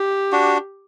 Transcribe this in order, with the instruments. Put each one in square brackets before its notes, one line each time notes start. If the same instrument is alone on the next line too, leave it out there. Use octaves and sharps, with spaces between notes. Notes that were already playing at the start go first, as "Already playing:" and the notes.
Already playing: [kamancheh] G4
[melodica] D4 F#4